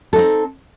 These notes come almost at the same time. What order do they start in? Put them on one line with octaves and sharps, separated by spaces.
A4 D#4 C4